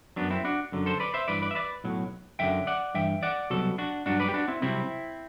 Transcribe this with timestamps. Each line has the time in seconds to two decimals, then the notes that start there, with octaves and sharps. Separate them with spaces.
0.16 F#2 F#3 B3 D4
0.30 C4 E4
0.45 D4 F#4
0.72 F#2 D3 F#3
0.86 A4 C5
1.00 B4 D5
1.14 C5 E5
1.28 G2 E3 B4 D5
1.42 B4 D5
1.51 E5
1.55 B4 D5
1.84 B1 A2 F#3
2.39 F#2 D3 F#3 E5 G5
2.67 D5 F#5
2.95 G2 E3 E5 G5
3.23 D5 F#5
3.50 C2 B2 F#3 F#4 A4
3.78 D4 F#4
4.06 G2 F#3 D4 F#4
4.20 B4 D5
4.29 G4
4.34 D4 F#4
4.48 C4 E4
4.62 C2 C3 F#3 C4 E4